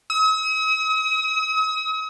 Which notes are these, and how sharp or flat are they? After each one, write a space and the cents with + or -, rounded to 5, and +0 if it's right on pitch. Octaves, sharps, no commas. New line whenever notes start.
D#6 +45